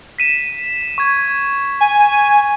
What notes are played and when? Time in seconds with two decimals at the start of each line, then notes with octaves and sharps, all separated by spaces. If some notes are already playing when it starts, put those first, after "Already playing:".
0.18 B6 D#7 E7
0.98 C#6 G#6
1.81 G#5